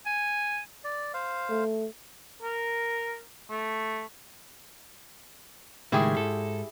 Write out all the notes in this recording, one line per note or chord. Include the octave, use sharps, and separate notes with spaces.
G#5
D5
C5 F5
A3
A#4
A3
C#2 A2 D#3 E4 G4 G#4
G#2 A4